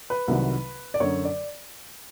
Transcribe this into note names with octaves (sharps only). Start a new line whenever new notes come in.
B4
C2 C3 D#3 F#3
D5
F#2 D3 F#3 C#5
D5